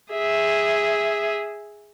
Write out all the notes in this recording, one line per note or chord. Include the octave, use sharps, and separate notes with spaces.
G#4 E5